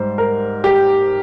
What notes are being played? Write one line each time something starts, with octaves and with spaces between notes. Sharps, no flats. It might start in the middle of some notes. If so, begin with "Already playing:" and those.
Already playing: G#2 G3 C5
A#4
G4